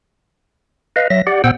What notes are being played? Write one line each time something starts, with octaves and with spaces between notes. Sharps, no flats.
B4 D#5 F5
F#3 E5 A#6
G4 D5 F#5
A#2 B3 C5 F#5 G5 E6